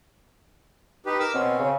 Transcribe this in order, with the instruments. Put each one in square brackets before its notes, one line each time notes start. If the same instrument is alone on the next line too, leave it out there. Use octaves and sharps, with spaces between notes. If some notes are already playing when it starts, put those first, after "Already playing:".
[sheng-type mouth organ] D#4 G4 B4
A#4 D6 E6
[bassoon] B2 [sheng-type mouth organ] C4 C#4
[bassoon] C#3